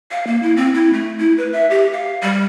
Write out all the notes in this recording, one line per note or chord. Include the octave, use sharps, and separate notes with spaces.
F5
A#3
E4
C4
E4
A3
E4
B4
E5
G4
F5
G3